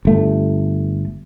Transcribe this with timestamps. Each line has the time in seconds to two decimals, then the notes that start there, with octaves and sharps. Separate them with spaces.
0.05 G1 A3